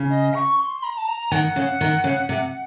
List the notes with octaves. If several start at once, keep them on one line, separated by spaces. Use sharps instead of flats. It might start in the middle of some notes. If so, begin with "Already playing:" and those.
Already playing: C#3
D#5
C#6
C6
A#5
A5
A#5
D#3 F#5
C#3
D#3
C#3
C3